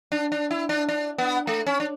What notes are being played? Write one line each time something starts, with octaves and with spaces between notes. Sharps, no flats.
D4
D4
E4
D4
D4
B3
A3
C#4
D4